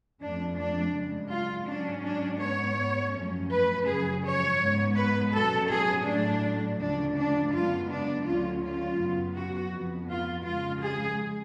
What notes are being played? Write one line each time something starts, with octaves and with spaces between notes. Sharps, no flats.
F2 F3 A3 D4
D4
F#2 C#3 G#3
F4
G#2 F#3 C#4 D4
D4
G#2 G#3 B3 C#5
F#2 F3 A3 C#4
B4
F#2 C#3 F3 G#4
C#5
G#2 G#3 B3
B4
B2 F#3 C#4 A4
G#4
A2 F#3 A3 D4
D2 C#3 F3 D4
D4
F#2 C#3 G#3 B3 F4
D4
D2 D3 F#3 C#4 F4
F4
F#2 C#3 F#3 B3
F#4
F2 F3 B3
F4
C#3 F3 G#3 F4
G#4